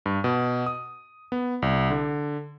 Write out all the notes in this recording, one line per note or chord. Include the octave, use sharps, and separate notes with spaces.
G2
B2
D#6
B3
C2
D3